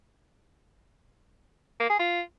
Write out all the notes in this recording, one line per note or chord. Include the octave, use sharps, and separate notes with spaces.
A#3
G#4
F4